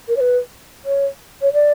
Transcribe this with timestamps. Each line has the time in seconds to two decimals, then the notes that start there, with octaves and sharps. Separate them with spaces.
0.08 A#4
0.16 C#5
0.20 B4
0.85 C#5
1.42 C#5
1.53 D5